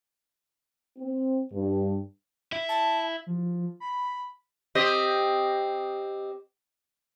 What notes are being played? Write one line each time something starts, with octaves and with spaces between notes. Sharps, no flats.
C4
G2
E4 E5
A5
F3
B5
C4 G4 D#5